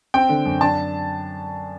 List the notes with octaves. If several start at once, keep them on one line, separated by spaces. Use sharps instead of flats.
C4 G5
D3
F#2
D4 A5